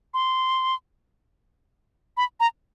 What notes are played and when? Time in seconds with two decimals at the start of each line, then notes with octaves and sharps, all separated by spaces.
0.14 C6
2.17 B5
2.40 A#5